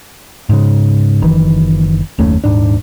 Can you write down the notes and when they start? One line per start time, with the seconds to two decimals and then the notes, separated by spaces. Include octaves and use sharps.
0.49 G#2 C#3
1.22 F#1 D#3 E3
2.18 F#1 D#2 A3 C#4
2.44 D#1 G#2 D4